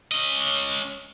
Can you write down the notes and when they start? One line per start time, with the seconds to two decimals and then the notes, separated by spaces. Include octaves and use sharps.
0.12 C#4 D#5